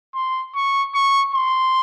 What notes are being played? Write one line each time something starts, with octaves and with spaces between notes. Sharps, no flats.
C6
C#6
C#6
C6